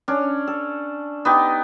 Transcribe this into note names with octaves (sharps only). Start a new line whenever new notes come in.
C#4 D4
A4
B3 D#4 G4